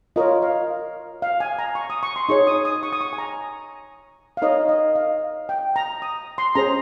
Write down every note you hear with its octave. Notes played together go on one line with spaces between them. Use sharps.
F4 A#4 C#5 D#5
F5
F5
G#5
A#5
C#6
D#6
C#6
C6
D#4 G#4 C#5 C#6
D#6
D#6
C#6
D#6
C#6
G#5
A#5
F5
D#4 A#4 C#5 D#5
D#5
F5
G5
A#5
D#6
C6
C#4 G#4 C5 A#5